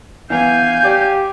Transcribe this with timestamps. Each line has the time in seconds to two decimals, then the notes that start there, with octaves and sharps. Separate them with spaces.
0.30 E3 B3 F5 G#5 G6
0.84 G4 D5